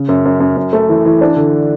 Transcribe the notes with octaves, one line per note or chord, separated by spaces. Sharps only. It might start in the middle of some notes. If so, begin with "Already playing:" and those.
Already playing: C#3
F#2
F#2
F#2
F#2
A3
E3
E3
D4
D3